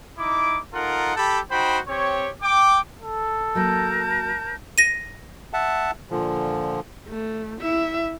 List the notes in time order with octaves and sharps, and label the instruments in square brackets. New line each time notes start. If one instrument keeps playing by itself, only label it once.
[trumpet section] D#4 E4 D6
D#4 F4 A4 A#4 F#5
G4 A4 G5 A5 B5
D#4 F#4 C5 G5 B5
C4 G4 C#5
G5 D6
[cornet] A4
[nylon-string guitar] F#3 A3 A#3 [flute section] A#4 A5 G6
[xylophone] A#6 D#7
[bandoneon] E5 F#5 A5
A#2 D3 F3
[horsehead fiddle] A3
E4 E5